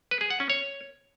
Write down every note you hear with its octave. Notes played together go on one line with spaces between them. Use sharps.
B4
G#4
F#5
C#4
C#5